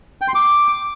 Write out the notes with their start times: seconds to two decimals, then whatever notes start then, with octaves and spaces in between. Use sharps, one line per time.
0.21 G5
0.28 C6
0.35 D6